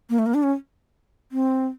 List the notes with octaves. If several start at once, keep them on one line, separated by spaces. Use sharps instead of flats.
A#3
A3
A#3
D4
C#4
C4